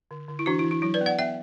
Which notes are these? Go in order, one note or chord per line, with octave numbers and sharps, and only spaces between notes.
D3
D3
E4
E3 D4 F#4
E4
E3
E4
F#3 E4
B4 D5
B3
D5 F#5
B3 E5 G5